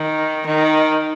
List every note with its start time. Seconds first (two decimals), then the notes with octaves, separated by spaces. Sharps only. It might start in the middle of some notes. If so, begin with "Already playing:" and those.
Already playing: D#3
0.46 D#3